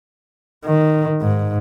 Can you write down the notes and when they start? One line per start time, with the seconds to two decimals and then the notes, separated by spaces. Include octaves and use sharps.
0.65 D#3
1.21 G#2